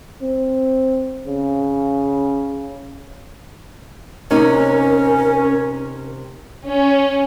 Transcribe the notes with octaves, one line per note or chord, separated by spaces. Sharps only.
C4
C#3
C3 C#4 D#4 A#4
C#4